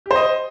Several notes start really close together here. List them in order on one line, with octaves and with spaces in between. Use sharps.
G4 C5 D#5